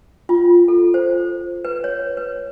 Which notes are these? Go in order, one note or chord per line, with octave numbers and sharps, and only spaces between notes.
F4
A4
C5
B4
C#5
B4